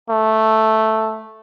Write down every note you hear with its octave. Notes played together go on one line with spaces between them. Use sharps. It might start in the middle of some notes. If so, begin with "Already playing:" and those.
A3